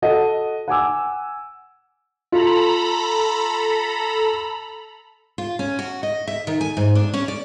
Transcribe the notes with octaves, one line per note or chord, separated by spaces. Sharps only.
F#4 A4 D#5 F#5
F#5 G#5 D6 E6
F4 A4 A#5 B5
F4
C#4
F#4
D#5
E5
D#3
G#5
G#2
D4
C#4
D5